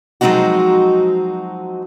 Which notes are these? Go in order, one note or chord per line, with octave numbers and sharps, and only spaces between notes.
F3 F#3 G#3 C4 D#4 F#4